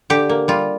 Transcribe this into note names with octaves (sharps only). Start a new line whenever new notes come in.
D3 G4
A#3
G3 F4